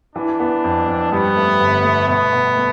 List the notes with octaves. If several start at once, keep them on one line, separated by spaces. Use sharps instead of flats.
E3 D4
B3
F2
F2
G2 B3
A3
G1
A3
B2 B3
B2
A3